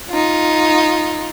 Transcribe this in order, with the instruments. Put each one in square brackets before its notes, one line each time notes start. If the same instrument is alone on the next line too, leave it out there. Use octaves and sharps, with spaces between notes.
[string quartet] D#4 F4